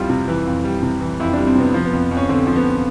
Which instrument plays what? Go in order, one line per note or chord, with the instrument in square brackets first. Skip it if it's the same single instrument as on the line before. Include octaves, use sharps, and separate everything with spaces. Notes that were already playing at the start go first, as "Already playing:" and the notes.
Already playing: [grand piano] F2 E3 G3 E4 F4
C3
E3
F2
G3
C3
E3
F2 E4
G3 D4
C4
C3 B3
F3
B3
F2
F2
C#4
D3 C4
F3
B3